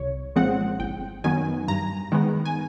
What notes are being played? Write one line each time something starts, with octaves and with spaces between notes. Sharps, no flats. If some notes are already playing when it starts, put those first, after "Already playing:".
Already playing: C2 C#5
A#2 F3 G#3 C4 F#5
G1 G5
F#2 D#3 F#3 B3 G#5
G2 A#5
D#3 G#3 B3
G#5